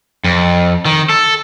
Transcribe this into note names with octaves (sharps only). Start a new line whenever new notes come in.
F2
D#3
A4